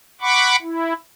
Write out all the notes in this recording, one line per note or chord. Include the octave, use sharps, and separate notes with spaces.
F#5 B5 C#6 D6
E4